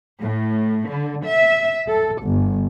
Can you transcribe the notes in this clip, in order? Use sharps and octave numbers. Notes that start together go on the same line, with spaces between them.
A2
D3
E5
A4
G1